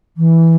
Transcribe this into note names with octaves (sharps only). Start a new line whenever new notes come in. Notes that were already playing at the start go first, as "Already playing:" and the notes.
E3